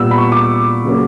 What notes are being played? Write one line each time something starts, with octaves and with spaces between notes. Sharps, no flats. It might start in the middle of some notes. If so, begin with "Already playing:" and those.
Already playing: A#2 G3 B3 E6
B5
C#6
D6
C#3 F#3 A#3 C#4